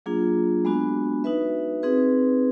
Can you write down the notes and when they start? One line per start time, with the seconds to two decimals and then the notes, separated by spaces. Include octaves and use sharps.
0.06 F#3 A#3 D4 F4 G#4
0.65 G#3 B3 D4 F#4
1.24 D#4 F#4 B4 E5
1.83 C4 D#4 G#4 B4